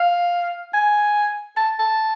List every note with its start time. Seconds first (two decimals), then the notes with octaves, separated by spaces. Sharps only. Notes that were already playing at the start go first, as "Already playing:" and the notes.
Already playing: F5
0.74 G#5
1.57 A5
1.79 A5